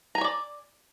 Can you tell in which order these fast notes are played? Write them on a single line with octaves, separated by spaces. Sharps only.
A#5 G#5 C#5 D5